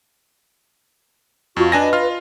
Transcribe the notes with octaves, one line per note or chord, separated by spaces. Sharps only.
F2 F4 F#4 C#6
D4 B4 D#5 G#5 A#6
F4 F6